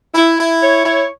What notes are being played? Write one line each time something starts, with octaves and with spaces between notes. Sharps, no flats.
E4
E4
C#5
E4